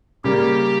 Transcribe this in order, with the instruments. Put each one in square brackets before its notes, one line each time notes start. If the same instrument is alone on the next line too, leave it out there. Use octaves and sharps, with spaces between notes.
[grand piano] C#3 G3 A#3 [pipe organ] G4